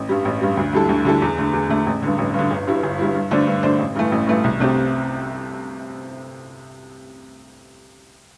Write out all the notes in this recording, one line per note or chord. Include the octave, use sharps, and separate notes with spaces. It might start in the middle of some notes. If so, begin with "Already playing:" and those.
Already playing: A1
G2 G3
A1
G2 G3
D2
D3 G3 E4 A4
D2
D3 G3 E4 A4
E2
D3 A3
E2
D3 A3
A1
G2 D3
A1
G2 D3
G1
G2 G3 E4
G1
G2 G3 E4
G2
D3 A3 D4 C5
G2
D3 A3 D4 C5
A1
G2 E3 A3
A1
G2 E3 A3
C2
C3 A3 C4 G4